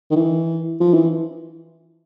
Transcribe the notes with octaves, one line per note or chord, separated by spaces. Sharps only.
D#3
E3
F3
E3